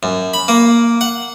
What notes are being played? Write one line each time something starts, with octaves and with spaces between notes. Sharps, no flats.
F#2
B5
A#3
F#5